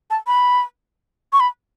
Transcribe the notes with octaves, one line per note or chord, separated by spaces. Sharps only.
A5
B5
C#6
B5